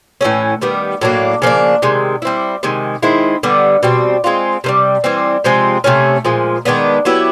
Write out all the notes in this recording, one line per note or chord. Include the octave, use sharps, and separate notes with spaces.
A2 E3 A3 C#4
D#3 G3 B3
A2 F#3 A#3 D4
C#3 F3 A#3 D4
C3 D#3 G#3
G3 C4 E4
C3 D#3 G#3
D#3 G#3 C4 E4
D3 G3 B3
B2 G3 C4
G#3 C4 F4
C3 D#3 G3
E3 G3 C4
C3 F3 G#3 C4
C3 F3 A3 C#4
A#2 F3 G#3
D#3 G#3 B3 D4
F#3 B3 E4 G4